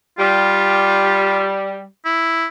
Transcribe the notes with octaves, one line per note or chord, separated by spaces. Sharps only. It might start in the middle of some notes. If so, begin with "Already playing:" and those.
G3 F4
E4